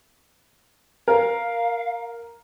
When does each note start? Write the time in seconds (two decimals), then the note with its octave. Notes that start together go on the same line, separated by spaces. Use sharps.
1.08 A#4 F5